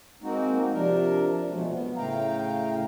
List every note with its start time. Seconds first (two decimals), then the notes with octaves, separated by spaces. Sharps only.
0.22 G#3 A#3 C4 D#4 F#4
0.72 C3 F3 D4 A#4
1.32 D4
1.48 B2 F3 F#3 G#3 A3
1.71 B3
1.97 A2 C#3 A3 F5 G5 A#5